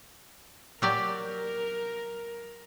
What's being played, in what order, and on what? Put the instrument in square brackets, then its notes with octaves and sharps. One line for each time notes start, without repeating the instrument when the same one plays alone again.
[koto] F#3 G4 D5 [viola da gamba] A#4